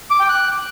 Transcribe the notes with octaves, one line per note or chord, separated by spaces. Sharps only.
D6
G5
F#6